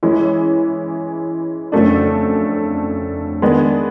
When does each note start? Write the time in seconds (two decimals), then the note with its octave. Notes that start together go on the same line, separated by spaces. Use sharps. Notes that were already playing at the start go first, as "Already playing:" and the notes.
0.03 E3 G#3 C#4 E4
1.72 F2 C#3 F#3 A3 D4
3.42 D#3 G#3 B3 D4